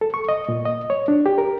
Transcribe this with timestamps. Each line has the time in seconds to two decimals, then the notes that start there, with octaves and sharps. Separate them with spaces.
0.01 A4
0.14 C#6
0.29 D#5
0.49 A#2
0.65 D#5
0.90 C#5
1.08 D4
1.26 G4
1.38 A#4